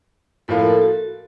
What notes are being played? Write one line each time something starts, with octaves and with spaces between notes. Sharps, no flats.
A2 F3 A#3 F4 A4
A#4
A4
F#4